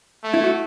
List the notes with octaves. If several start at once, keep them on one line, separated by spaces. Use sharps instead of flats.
A3
E4
F#4